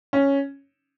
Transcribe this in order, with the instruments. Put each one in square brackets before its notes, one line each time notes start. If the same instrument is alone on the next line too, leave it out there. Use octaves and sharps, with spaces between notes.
[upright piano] C#4